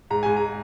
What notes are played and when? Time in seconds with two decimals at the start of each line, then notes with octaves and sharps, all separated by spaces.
0.10 G#2 A#5
0.23 G#2 G#5
0.37 A#5